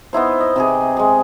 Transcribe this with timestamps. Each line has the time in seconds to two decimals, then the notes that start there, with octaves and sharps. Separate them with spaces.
0.13 B3 D#4 E4 C5
0.41 D#5
0.56 C3 G4 G#4
0.97 G#3 G#4